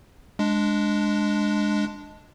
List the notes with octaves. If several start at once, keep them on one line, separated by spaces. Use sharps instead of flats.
G#3 D4